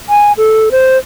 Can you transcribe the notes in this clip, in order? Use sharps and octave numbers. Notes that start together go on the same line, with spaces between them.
G#5
A4
C5